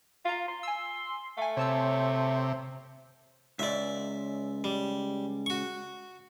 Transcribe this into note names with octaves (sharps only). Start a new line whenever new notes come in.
F4 F5 A#5
C6
G#5 E6
A3 F5 G#5
C3 C#5 A5 E6
C#2 D5 E5
G3
F#4 C#6